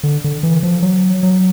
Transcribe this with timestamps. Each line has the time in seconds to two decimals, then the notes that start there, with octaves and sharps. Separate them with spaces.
0.03 D3
0.24 D3
0.43 E3
0.63 F3
0.82 F#3
1.23 F#3